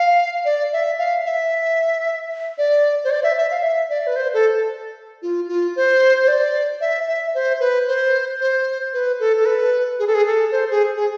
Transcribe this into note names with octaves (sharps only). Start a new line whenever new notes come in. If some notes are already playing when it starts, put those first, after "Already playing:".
Already playing: F5
D5
E5
F5
E5
D5
C5
D5
E5
E5
F5
E5
D5
B4
C5
A4
F4
F4
C5
C5
D5
E5
E5
C5
B4
C5
C5
B4
A4
A4
B4
G#4
A4
G#4
A4
C5
G#4
G#4